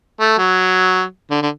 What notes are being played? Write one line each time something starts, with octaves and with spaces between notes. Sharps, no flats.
A3
F#3
D3
D3